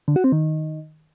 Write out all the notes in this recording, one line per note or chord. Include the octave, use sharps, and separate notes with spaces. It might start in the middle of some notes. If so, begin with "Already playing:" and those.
D3
F#4
C4
D#3